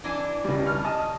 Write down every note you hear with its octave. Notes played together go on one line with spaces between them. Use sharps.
E3 D4 G#5
C#2 G3
C#6 F6
D#5 A5 D#6